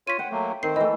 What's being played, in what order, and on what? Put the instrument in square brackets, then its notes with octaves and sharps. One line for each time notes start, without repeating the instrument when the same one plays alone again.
[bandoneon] F4 C#5 [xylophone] B6 D#7
[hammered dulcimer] C5 G5 [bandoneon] F#5
[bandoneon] F#3 A3 A#3
[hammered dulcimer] D#3 [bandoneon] C4 C5 [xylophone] C7
[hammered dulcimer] E3 A3 [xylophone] D#5